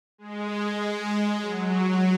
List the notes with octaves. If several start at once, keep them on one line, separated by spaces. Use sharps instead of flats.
G#3
F#3